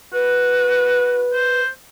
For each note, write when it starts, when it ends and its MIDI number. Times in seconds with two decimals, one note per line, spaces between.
0.13 1.27 66
0.13 1.60 71
1.33 1.68 72